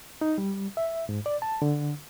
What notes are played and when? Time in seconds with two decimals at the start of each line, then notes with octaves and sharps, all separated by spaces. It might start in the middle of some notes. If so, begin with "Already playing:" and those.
0.21 D#4
0.38 G3
0.77 E5
1.09 G#2
1.26 D5
1.42 A5
1.62 D3